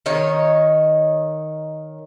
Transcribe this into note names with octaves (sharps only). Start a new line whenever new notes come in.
D#3 D#4 C#5